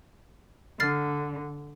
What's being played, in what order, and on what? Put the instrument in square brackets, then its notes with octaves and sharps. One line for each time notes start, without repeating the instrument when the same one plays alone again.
[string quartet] D3 [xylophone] F6 A6 C7